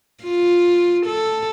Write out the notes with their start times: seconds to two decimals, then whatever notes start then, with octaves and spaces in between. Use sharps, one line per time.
0.23 F4
1.06 A4